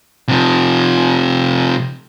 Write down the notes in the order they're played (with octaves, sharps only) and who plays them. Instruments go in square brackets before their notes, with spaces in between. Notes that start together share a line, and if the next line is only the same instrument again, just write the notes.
[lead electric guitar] C3 F3